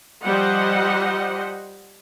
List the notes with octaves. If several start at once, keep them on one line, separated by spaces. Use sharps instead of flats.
F3 G3 C5 D#5 F#5